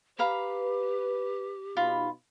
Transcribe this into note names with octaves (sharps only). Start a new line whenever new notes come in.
G4 B4 F5 A#5 B5
B2 D#4 F4 B5